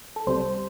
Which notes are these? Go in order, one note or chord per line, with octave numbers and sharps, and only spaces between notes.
A4
C2 C3 G3 C5